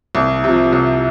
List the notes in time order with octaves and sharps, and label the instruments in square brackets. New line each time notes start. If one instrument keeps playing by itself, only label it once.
[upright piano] C2
C3 F3
C2